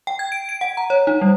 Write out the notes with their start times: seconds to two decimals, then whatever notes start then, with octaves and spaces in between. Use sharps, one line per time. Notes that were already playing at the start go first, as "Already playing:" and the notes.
0.07 G5
0.19 G#6
0.32 D7
0.49 D7
0.61 F#5
0.77 A#5
0.90 C#5
1.07 D#4
1.22 G3